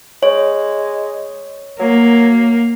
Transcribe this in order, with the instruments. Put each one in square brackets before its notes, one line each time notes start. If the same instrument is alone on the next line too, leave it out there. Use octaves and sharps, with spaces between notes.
[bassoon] G#3 [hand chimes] C#5
[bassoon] F#3 [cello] A#3